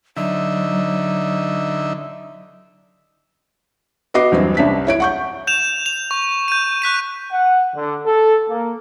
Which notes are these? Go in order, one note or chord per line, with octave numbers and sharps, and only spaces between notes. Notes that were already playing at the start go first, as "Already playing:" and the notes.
D3 F#3 D#4 E5
B3 F#4 D#5 D6 C7
E2 G2 F#3 C4
C2 C#4 D4 B6
E4 C#5 D7
F#5 C#6 G6
G6 E7 F7
F7
C#6
G6 D#7
C#6 F#6 B6 D#7
F#5
D3
A4
A#3